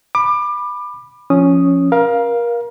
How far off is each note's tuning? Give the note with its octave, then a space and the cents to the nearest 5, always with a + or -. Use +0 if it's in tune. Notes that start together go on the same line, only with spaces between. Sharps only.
B5 +0 D6 +25
F3 +0 C#4 +0 D#6 +0
A#4 +30 F5 +0